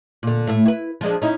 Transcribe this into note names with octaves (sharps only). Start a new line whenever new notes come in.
A#2 D3
A2 A3
E4 B4
F3 G#3 D4
C#4 D#4 E4